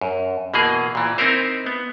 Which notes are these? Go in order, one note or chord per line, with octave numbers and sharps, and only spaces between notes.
F#2
B2 E3 A#3 G#4
A#2 E3
C4 D#4 E4 A#4 C5
B3